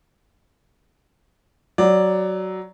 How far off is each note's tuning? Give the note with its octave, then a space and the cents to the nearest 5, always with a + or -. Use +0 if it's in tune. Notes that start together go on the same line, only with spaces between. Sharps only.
F#3 +15 D5 +0